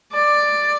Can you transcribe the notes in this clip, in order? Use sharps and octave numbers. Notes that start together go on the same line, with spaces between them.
D5